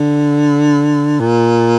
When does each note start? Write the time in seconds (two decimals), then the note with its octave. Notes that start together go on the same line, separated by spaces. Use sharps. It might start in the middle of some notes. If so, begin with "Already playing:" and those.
Already playing: D3
1.20 A#2